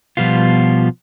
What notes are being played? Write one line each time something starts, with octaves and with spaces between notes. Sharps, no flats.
B2 F3 G3 B3 F4